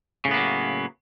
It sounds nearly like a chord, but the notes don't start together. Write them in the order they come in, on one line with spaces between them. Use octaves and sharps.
C#3 A2 B3 A#3 F#3